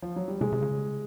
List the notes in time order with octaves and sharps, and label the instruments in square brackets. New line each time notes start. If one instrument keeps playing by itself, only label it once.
[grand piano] F3
F#3
G3
[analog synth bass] C3 [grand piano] G#3
[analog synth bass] C3
C#3